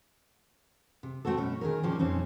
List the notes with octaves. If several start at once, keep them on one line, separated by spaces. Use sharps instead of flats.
C3
A3 C4 C#4 F#4 A4
B2 C#4
D#3 G#4 A#4
A#2 D#3 F3 C#4 G4
F2 A#2 C4 C#4 D#4